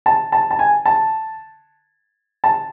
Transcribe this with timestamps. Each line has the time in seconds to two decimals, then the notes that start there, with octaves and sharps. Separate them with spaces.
0.06 A5
0.32 A5
0.51 A5
0.59 G#5
0.86 A5
2.44 A5